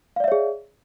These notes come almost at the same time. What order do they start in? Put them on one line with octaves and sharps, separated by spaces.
F5 D5 E5 C#5 G#4